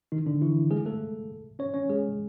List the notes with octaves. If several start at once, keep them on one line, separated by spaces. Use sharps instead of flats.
D#3 D#4
D3 D4
E3 E4
G#3 G#4
A3 A4
C#4 C#5
C#4 C#5
G#3 G#4